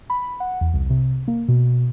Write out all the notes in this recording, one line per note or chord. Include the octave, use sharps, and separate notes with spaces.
B5
F#5
E2
C2
C3
A#3
B2